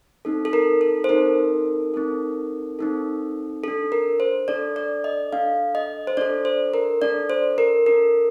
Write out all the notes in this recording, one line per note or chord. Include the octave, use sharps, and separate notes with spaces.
C4 D#4 A4
A4
A#4
A4
C5
C4 D#4 A4 A#4
C4 D#4 A4
C4 D#4 A4
D4 A4
A#4
C5
D4 A4 D5
D5
D#5
D4 A4 F5
D#5
C5
D4 A4 D5
C5
A#4
D4 A4 D5
C5
A#4
D4 A4 A#4